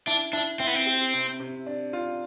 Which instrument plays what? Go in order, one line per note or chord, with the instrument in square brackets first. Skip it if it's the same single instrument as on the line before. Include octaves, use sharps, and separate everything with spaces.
[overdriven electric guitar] D4 [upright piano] E4
[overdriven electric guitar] D4 [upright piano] E4
[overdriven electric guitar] C4 [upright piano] E4
[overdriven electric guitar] B3
C4
[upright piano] G4
C3
C3
D4
F4